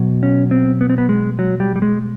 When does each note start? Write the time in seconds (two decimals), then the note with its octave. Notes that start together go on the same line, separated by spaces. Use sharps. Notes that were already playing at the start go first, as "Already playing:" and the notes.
Already playing: B2 F#3
0.23 C#4
0.51 C4
0.81 B3
0.90 C4
0.98 B3
1.09 G#3
1.39 F#3
1.60 G3
1.76 G3
1.82 G#3